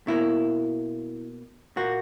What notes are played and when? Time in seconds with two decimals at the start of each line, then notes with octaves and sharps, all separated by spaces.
0.07 B2 A#3 E4
1.76 A#2 A#3 F#4